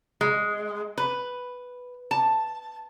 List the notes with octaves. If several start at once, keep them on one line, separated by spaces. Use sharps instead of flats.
G#3
B4
A5